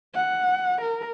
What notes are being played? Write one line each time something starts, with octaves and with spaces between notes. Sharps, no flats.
F#5
A#4